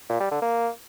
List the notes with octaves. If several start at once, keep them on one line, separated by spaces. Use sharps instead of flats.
A#2
G3
D3
A#3